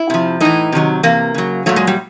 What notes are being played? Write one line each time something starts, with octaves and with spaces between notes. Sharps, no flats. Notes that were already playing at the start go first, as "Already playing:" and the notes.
Already playing: E4
C3 F3
A2 E3 D#4
C3 D#3 F#3
C3 E3 A#3
C#3 F#3
A#2 F#3 A3
G#3
G3